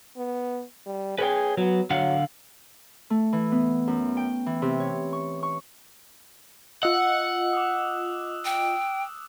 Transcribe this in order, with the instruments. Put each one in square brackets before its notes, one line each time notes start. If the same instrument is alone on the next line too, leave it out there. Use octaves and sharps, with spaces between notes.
[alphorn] B3
G3
[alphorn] G#4 [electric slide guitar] B4 C#5 G5
[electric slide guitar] F#3 [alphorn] B3
[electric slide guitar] D3 F5 F#5 [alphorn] F#3
[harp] A3
E3
B3
F#2
G5
E3
C3
C#5
C#6
C#6
[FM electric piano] F4 D#5 [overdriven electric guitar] F#5 [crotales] E6 F#6
[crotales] D6 D#6
[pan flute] G5